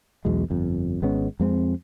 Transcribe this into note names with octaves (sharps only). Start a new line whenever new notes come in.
B1 E2 B2 G#3
G1 F2
G#1 G#3 B3 C#4
F2 G#3 C4